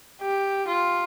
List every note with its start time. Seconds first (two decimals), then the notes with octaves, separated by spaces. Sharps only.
0.21 G4
0.68 F4